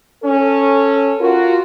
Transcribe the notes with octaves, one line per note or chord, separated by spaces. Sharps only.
C#4 A4
F4 F#4 A#4